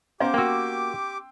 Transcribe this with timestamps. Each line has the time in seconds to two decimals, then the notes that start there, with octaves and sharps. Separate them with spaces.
0.20 B3 C#4 G4 C5 F5 F#5 D6
0.34 A#3 F#4 G5 C6 E6